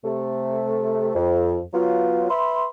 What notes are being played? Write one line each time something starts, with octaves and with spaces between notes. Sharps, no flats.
C3 A3
F2
F#3 B3 F4
B4 E5 B5 C6